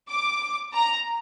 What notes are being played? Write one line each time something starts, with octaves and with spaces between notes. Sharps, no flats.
D6
A#5